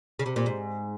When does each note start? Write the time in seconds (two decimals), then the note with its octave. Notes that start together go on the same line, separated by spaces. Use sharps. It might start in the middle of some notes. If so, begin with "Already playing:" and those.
0.19 C#3
0.26 C3
0.36 A#2
0.46 G#2